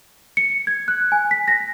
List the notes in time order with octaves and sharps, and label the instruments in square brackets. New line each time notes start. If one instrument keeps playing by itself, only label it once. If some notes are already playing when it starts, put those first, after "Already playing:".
[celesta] C#7
G#6
F#6
G#5
B6
A#6